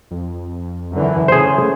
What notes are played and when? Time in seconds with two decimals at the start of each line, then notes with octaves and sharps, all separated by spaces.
0.11 F2
0.93 F#2 D3 E3
1.28 C#3 A3 G#4 C5